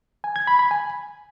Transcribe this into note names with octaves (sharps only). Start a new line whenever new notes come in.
G#5
G#6
B5
B5
G#5